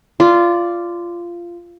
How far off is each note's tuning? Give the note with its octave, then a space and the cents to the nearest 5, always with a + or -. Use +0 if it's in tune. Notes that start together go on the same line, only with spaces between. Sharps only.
F4 -15 D5 +0